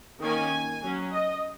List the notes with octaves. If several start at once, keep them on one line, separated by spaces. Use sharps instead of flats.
D#3 A#3 C#4 G#5
F#3 C#4
D#5